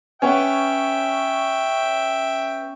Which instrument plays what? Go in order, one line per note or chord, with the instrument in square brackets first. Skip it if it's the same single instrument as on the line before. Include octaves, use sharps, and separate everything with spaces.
[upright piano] B3 C#5 [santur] C#4 [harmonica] E5 G5